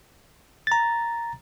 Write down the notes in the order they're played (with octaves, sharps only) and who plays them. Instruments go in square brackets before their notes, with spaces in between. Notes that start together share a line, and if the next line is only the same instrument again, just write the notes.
[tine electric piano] A#5 A6